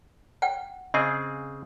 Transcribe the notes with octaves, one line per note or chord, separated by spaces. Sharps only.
F#5 G5
C#3 C4 G#4 D#5